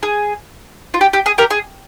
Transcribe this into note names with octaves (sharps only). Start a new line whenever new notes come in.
G#4
F4
G4
G4
G#4
G4 A#4
G#4